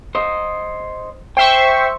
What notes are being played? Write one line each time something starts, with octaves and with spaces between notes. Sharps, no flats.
C5 D#5
C5 E5 G5 C#6